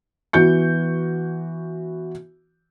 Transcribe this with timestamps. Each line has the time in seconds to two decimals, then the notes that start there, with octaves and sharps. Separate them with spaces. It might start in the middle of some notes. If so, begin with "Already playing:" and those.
0.33 E3 B3 F#4 G6 C#7